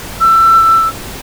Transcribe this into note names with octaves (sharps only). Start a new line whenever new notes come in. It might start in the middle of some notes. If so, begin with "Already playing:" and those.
E6